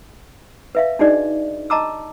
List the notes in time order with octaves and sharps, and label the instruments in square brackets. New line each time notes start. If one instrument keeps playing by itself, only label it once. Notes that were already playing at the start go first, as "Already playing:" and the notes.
[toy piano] B4 E5 F5
D4 D#4 F#4 G#4 D5 D#5
D#5 A5 A#5 D6 E6